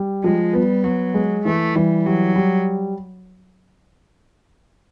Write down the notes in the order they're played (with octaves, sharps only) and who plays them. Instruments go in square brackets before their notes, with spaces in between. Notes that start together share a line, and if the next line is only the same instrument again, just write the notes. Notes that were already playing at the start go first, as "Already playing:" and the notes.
Already playing: [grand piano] G3
[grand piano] F3 [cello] G#3
[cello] G3 [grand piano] B3
[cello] F#3 [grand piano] B3
[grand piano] G#3
[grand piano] E3 [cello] A3
[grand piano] E3 [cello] G3
[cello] F#3 [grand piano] G3
[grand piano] G3